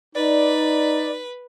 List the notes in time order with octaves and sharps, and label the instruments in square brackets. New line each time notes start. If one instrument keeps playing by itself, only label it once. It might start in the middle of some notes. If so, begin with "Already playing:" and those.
[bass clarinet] D#4 [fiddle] B4 [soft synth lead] D5